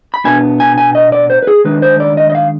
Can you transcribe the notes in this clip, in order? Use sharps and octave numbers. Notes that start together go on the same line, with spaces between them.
B5
B2 B3 D4 G#5
G#5
G#5
D#5
D5
C5
B4
G#4
D#3 G#3 D4 B4
C5
D5
D#5
D#5
F5